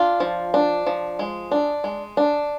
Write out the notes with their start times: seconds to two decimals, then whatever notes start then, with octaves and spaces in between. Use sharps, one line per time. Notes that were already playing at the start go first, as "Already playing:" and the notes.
Already playing: D4 F4
0.20 F3
0.54 D4
0.86 F3
1.19 G#3
1.51 D4
1.84 G#3
2.17 D4